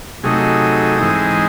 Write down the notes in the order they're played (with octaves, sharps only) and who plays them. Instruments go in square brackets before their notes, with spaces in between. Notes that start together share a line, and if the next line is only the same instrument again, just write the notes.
[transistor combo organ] C3 F#3 A3 D#4 G#4
G#2 E3 C4 D#4